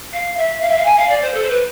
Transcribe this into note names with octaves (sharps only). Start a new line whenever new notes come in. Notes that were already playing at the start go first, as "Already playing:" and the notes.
F5
E5
F5
E5
F5
G#5
F5
D5
C5
A4
C5
B4